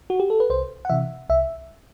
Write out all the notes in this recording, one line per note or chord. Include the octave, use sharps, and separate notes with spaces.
F#4
G4
A4
B4
C2 C5
F#5
C3 E3 E5
C2 E5